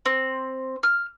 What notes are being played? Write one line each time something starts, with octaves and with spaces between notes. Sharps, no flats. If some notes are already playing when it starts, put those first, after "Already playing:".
C4
F6